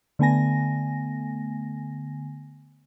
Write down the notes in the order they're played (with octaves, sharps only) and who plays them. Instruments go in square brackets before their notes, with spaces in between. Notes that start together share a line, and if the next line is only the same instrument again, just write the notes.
[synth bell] D3 A3 B3 G#5 A#6